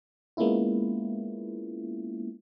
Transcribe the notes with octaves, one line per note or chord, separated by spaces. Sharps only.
G#3 A#3 B3 C#4 E4 F4